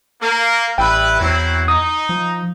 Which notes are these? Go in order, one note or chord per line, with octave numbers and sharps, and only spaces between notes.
A#3
A1 G3 E4 B4 G5
E2 F#3 C4 E4
D#4 D#6
F3